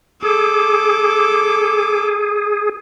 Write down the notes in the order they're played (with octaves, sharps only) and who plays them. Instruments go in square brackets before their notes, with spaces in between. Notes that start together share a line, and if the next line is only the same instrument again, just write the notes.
[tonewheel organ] G#4 [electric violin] A4 D6